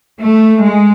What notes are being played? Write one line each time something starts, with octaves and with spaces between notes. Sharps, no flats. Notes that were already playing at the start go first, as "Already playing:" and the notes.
A3
G#3